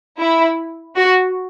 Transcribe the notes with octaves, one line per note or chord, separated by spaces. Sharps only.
E4
F#4